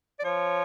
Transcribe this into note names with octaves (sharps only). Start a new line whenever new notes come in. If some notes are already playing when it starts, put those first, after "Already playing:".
D5
F3 C#5